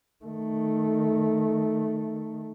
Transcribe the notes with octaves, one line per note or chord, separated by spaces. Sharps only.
D#3 A3